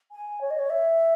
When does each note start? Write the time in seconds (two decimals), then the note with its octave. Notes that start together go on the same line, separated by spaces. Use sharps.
0.12 G#5
0.41 C#5
0.51 D#5
0.59 C#5
0.70 E5